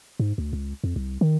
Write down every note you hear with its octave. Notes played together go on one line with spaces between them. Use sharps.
G#2
D2
C#2
F2
C2
D#3